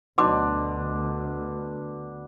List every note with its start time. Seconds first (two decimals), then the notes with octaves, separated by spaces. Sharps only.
0.18 D2 B2 D4 F#5 C6 D6